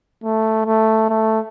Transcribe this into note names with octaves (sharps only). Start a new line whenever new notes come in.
A3
A3
A3